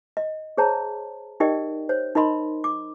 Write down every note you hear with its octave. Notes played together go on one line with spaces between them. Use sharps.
D#5
G#4 C5 C#5 A5 A#5
D#4 G4 A#4 D5 D#5 G5
C5 C#5
D#4 A#4 D#5 B5 C6
D6